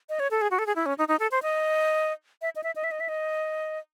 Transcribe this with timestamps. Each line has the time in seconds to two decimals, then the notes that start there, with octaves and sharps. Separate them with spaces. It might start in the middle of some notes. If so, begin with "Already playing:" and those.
0.09 D#5
0.20 C#5
0.31 A4
0.42 G#4
0.51 F#4
0.59 A4
0.66 G#4
0.76 E4
0.86 C#4
0.98 D#4
1.08 D#4
1.19 A4
1.31 C5
1.43 D#5
2.42 E5
2.56 D#5
2.64 E5
2.76 D#5
2.84 E5
2.91 D#5
3.00 E5
3.09 D#5